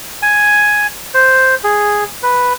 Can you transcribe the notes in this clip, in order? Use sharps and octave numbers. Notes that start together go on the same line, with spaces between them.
G#5
C5
G#4
B4